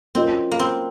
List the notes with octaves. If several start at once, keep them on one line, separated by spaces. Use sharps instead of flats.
F#3 C4 C#4 F4 A#4 D#5
A#3
C4